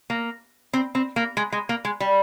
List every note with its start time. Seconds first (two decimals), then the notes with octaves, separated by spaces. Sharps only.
0.10 A#3
0.73 C4
0.95 C4
1.16 A#3
1.37 G#3
1.52 G#3
1.69 A#3
1.85 G#3
2.00 G3